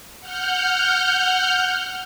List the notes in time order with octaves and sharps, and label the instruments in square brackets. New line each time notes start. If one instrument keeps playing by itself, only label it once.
[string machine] F#5 F6 G6